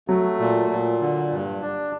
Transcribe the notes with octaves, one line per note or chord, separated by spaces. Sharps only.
F#3 A3
A#2
A#2
D3
G2
D4